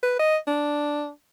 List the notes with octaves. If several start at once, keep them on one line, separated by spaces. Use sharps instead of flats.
B4
D#5
D4